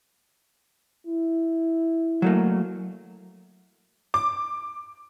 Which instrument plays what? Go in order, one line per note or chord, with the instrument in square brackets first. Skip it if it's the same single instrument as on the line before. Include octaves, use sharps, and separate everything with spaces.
[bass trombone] E4
[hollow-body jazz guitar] F#3 A3 A#3
[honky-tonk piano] D6